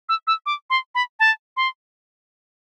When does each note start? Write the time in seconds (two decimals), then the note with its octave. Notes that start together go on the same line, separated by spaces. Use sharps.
0.09 E6
0.27 E6
0.46 D6
0.70 C6
0.95 B5
1.20 A5
1.57 C6